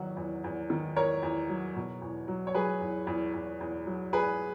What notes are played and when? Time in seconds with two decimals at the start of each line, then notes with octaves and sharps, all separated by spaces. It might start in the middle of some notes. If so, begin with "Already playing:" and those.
Already playing: E2 D#3 F#3 F#4
0.17 E2
0.44 E2
0.70 D#3
0.96 E2 A#4 C#5
1.23 E2
1.49 F#3
1.76 B2
2.02 E2
2.28 F#3
2.47 C#5
2.54 F#3 G#4 B4
2.81 E2
3.07 E2
3.34 E2
3.61 E2
3.86 F#3
4.13 E2 G#4 B4